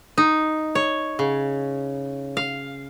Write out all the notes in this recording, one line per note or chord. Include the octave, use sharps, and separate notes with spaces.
D#4
C#5
C#3
F5